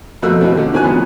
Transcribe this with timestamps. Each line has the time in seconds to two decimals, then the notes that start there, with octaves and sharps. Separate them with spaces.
0.22 F2 B2 A3 A#3 E6 F#6
0.41 D#2 B2 E3 A3 C4
0.57 D3
0.72 A#2 D#3 C4 F#4 G#5 F#6
0.84 C#2 F3 B3